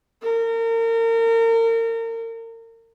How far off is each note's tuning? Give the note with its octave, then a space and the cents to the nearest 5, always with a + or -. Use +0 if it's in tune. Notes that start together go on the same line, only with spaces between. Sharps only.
A#4 -35